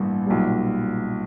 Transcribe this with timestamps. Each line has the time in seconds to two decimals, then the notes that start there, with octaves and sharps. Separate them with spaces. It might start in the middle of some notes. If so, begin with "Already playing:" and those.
Already playing: A1 G2 E3 G3 A#3
0.26 B1 A#2 G3